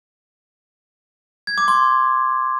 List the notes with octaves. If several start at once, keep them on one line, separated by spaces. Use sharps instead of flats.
G#6
D6
C6